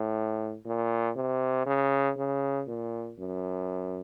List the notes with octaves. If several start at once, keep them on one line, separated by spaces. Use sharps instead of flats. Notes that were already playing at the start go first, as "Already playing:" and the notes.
Already playing: A2
A#2
C3
C#3
C#3
A#2
F#2